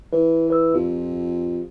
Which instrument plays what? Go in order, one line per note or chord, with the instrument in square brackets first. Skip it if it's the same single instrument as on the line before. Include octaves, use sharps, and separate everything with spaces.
[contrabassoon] E3 [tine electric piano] B4
[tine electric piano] B4 E6
[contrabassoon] F2 [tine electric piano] F4 G4